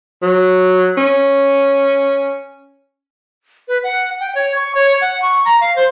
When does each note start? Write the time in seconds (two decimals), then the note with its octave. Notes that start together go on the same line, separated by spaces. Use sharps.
0.23 F#3
0.98 C#4
3.68 B4
3.84 F#5
4.20 G5
4.35 C#5
4.56 C#6
4.75 C#5
5.01 F#5
5.22 C#6
5.45 A#5
5.61 F5
5.76 C5